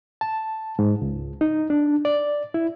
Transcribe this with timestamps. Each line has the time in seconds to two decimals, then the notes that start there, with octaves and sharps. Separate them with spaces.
0.21 A5
0.79 G#2
1.01 C#2
1.41 D#4
1.70 D4
2.05 D5
2.54 E4